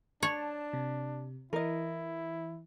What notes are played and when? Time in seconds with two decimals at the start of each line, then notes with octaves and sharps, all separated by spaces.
0.23 D4 C#5 A5
0.73 C3
1.53 E3 E4 A#4 D#5